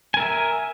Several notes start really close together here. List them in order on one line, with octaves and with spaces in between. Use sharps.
G#5 A#4 E5